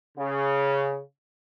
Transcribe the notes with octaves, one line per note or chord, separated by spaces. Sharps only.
C#3